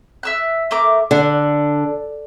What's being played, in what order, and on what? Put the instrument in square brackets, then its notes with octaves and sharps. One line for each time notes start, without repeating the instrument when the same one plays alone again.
[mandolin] E5 E6 F#6
A3 A#4 D6
[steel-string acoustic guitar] D3 [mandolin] D4